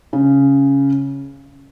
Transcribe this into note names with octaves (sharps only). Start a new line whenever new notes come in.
C#3